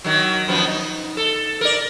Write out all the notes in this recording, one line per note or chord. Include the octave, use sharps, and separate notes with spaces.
D#3 F#3
F#2 F3 B3
D#4
A4
A#4 D5